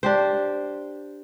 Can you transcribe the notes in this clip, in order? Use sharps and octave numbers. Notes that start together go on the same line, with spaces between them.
D4 G4 C5